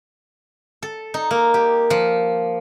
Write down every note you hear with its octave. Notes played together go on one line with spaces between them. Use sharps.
A4
D#4
A#3
G4
F3